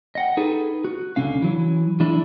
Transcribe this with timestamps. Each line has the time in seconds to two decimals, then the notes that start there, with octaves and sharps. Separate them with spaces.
0.15 D#5 F#5 G5
0.37 D#4 G#4 A4 B4
0.85 F#4
1.16 C#2 D3 E3 C#4 F5
1.42 E3 F#3
2.00 E3 G#3 D4 E4